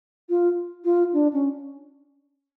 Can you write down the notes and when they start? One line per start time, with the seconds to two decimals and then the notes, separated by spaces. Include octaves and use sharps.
0.29 F4
0.84 F4
1.13 D4
1.33 C#4